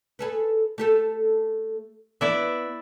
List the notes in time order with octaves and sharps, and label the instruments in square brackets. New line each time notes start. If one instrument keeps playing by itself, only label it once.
[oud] G#4 A4 B4
A3 G4 A4
[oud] B3 [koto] E4 D5 E5